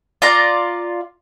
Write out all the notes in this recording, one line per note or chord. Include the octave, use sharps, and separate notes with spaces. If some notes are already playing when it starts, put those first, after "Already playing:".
F4 D5 A#5